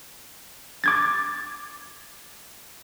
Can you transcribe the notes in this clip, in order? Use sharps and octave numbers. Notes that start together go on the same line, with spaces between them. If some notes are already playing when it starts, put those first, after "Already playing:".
D6 G#6 A6